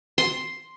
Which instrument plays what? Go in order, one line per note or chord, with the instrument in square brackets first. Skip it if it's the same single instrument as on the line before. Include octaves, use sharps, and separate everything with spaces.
[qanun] C6